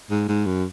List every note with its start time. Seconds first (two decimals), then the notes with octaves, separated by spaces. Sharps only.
0.11 G#2
0.28 G#2
0.46 F#2